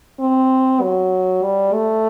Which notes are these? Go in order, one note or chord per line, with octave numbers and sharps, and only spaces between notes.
C4
F#3
G3
A3